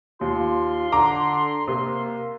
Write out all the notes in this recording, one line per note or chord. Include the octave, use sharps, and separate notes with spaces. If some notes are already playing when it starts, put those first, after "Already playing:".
D#2 F4 C6
D3 A#5 D6
C3 A#3